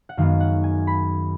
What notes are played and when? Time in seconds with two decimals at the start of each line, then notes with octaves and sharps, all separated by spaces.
0.09 F#5
0.17 F#2 D#3 G#3 B3 F5
0.40 F#5
0.64 G#5
0.87 B5